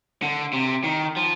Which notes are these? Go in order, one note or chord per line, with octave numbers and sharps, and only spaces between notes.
D3
C3
D#3
F3